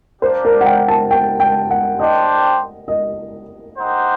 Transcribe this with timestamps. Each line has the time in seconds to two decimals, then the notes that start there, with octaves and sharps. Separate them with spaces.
0.22 A#3 D4 G4 C5 D5
0.45 A#4
0.61 F#5
0.66 G5
0.88 A5
1.11 G5
1.40 G5
1.70 F#5
1.99 D4 G4 C5 D#5 G5
2.88 D#5
3.77 D#4 G4 C5 F#5